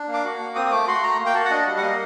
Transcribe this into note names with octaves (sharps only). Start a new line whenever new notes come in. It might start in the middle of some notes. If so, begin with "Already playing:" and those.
Already playing: D4
A#3
D6
F#4
A#3
C4 D#6
D#6
A3 D6
F#4 C6
A3 A#5
A#3
G5
F#4 A5
F#5
D4 D#5
G3
F#5
A#3 D#5